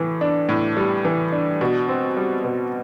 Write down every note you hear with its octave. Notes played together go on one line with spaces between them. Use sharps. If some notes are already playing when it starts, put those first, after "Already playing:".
Already playing: A2 E3
D4
A2
G3
E3
D4
B2
C4
G3
B2